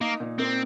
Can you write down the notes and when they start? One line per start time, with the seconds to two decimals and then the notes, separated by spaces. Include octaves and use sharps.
0.01 A#3 D#4
0.20 A#2
0.39 A#3 C4